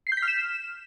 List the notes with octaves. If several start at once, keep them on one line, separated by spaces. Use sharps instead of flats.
C7
G6
B6
F6
E7